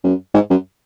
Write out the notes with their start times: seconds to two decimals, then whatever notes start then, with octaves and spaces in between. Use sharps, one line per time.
0.04 F#2
0.34 G#2
0.50 F#2